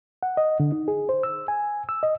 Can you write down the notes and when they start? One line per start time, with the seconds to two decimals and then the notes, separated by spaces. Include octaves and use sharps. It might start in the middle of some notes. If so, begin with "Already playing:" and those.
0.23 F#5
0.37 D#5
0.60 D3
0.72 D#4
0.88 G#4
1.09 C5
1.23 E6
1.48 G#5
1.89 E6
2.03 D#5